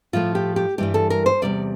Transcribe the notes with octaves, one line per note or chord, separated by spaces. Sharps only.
A2 F3 A3 F4
G4
G4
G2 E3 G3 G4
A4
A#4
C5
E2 C3 G3 D5